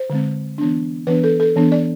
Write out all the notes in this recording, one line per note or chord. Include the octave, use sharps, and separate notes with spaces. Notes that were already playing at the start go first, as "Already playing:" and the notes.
Already playing: C5
D3 G#3 C4
E3 B3 D4
E3 B3 D4 B4
A4
A4
E3 B3 D4
D5